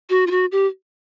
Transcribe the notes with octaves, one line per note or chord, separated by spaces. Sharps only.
F#4
F4
F#4
G4